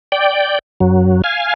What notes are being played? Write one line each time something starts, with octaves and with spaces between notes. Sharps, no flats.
D5 G5
F#2 F#3
F5 G#5